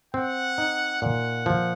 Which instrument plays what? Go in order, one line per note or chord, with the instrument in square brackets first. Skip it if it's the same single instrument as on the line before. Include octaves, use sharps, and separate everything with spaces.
[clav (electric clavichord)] C4 [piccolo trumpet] F#5
[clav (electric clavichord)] D#4
[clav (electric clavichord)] A#2 [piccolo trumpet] F#5
[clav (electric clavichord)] F3